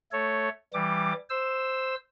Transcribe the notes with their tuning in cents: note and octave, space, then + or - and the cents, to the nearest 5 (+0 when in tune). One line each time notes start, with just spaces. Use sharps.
A3 +0 A4 +0 C#5 +0
E3 +0 G3 +0 D6 +20
C5 +0 E6 +0